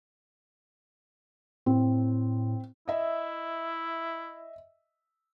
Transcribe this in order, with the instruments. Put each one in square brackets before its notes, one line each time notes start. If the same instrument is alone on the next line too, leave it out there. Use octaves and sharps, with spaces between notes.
[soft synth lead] A2 [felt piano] C4
[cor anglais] E4 [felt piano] D#5 E5